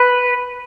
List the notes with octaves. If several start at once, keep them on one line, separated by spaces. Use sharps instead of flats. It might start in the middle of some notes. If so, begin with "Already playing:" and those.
Already playing: B4